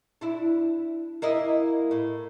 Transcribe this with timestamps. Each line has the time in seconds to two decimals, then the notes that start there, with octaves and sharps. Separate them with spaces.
0.21 D4 E4
1.22 A#3 E4 D#5
1.91 A2